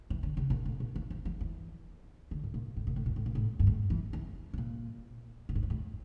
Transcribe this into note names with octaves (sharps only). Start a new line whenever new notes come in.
E3
D3
C#3
A#2
A2
A#2
E3
F3
F3
E3
D3
A2
A#2
A2
A#2
A2
A#2
A2
A#2
A2
G2
A2
E3
E3
C#3
A#2
A#2
A2
G2
A2